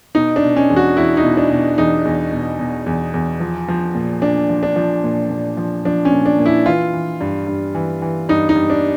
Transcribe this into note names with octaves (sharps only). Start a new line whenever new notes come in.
B2 D#4
D4
B2
C#4
E2
F#4
E2 E4
D#4
B2
D4
B2
E2 D#4
E2
B2
B2
E2
E2
F3
F3
A#2
A#2 D4
F3
D4
F3
A#2
A#2
F3
F3 D4
C#4
A#2
D4
A#2
E4
E3 F4
E3
G2
G2
E3
E3
G2 D#4
D#4
G2
D4